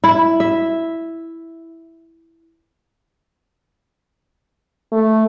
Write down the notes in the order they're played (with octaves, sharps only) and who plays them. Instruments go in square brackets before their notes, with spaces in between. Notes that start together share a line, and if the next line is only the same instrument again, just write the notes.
[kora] E4
E5
[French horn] A3